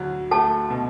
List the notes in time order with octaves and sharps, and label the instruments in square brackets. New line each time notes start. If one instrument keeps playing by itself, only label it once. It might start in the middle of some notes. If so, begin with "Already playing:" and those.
Already playing: [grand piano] D2 F#3
[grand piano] A3 [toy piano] A4 A5
[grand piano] B2